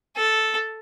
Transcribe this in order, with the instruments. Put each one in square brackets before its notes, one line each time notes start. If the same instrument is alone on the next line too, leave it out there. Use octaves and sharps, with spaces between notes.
[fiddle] A4